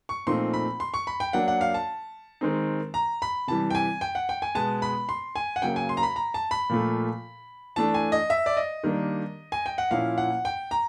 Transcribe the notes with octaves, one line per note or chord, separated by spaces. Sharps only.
C#6
A#2 F3 A3 C4 D#4 C6
B5
C6
C#6
B5
G5
F#3 A#3 D4 F#5
F#5
F5
A5
D#3 G#3 C4 D#4
A#5
B5
C3 E3 G3 A5
G5
G#5
G5
F#5
G5
G#5
B2 G#3 B3 A5
B5
C6
G#5
F#5
C#3 F#3 A#3 G5
G#5
C6
A#5
B5
A#5
A5
B5
A#2 F3 A3
E3 A3 D4 A5
G#5
D#5
E5
D5
D#5
D#3 G3 A#3 D4
G#5
G5
F#5
A#2 F3 A#3 C#4 E4 F5
F#5
G5
A#5